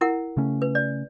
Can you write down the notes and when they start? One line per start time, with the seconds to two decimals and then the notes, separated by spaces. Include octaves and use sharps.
0.01 E4 A#4 F#5
0.37 C#3 A3 C#4
0.62 B4
0.75 D5